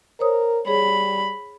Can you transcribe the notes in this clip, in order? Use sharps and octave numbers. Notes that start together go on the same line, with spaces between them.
A#4 C5 C#5 D#6
G3 G#4 C#5 B5